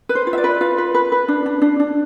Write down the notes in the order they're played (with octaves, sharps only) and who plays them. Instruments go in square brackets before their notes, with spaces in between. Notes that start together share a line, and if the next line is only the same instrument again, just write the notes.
[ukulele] B4
C5
F4
E5
D5
B4
F4 F5
B4
B4
B4
D4
D4
D4
D4